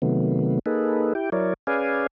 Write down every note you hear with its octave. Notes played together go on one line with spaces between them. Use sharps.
C3 D#3 F#3 A3 B3
A#3 D#4 G#4 A4 B4
E4 G4 G5
F#3 E4 A#4 C#5 D5
C#4 G#4 B4 D5 F5 G#5